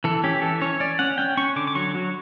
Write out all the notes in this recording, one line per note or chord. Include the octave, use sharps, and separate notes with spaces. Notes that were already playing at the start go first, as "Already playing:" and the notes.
E3 A4
C#4 G4
E3 A4
C#4 C#5
C#4 D5
C#4 F#5
C#4 G5
C#4 C#6
D3 D6
D6
F#3 C#6
F#3